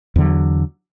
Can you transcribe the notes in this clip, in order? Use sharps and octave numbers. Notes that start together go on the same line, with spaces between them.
E2 D3 F#3